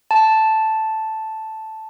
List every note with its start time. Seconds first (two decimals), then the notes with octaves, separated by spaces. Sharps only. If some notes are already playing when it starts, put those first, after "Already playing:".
0.11 A5